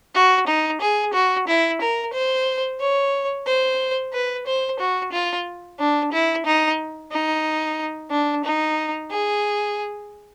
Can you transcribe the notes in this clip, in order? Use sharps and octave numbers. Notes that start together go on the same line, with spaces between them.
F#4
D#4
G#4
F#4
E4
A#4
C5
C#5
C5
B4
C5
F#4
F4
D4
E4
D#4
D#4
D4
D#4
G#4